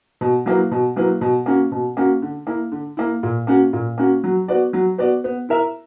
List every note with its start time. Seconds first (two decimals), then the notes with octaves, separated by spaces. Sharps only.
0.21 B2
0.46 F#3 A#3 E4 B4
0.71 B2
0.96 F#3 A#3 E4 B4
1.21 B2
1.46 A#3 C#4 F#4
1.72 B2
1.97 A#3 C#4 F#4
2.22 D3
2.47 A#3 E4
2.72 D3
2.97 A#3 E4
3.23 A#2
3.47 A#3 C#4 F#4
3.73 A#2
3.98 A#3 C#4 F#4
4.24 F#3
4.48 B3 F#4 B4 D5
4.73 F#3
4.98 B3 F#4 B4 D5
5.24 B3
5.49 E4 A#4 E5